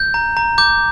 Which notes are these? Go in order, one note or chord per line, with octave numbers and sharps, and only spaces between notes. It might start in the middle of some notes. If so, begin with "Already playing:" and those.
Already playing: G6
A#5
A#5
D6 G6